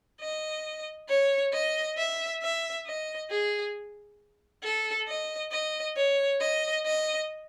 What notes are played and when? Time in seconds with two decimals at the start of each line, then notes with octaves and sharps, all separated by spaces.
0.20 D#5
1.09 C#5
1.53 D#5
1.98 E5
2.42 E5
2.86 D#5
3.30 G#4
4.63 A4
5.08 D#5
5.52 D#5
5.96 C#5
6.40 D#5
6.85 D#5